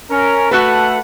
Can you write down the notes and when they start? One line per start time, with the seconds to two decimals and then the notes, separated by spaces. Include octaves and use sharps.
0.10 C#4 A#4
0.51 A3 F#4 A4 B4 F#5